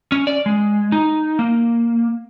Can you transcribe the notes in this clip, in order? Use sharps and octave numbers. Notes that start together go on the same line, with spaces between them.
C#4
D5
G#3
D#4
A#3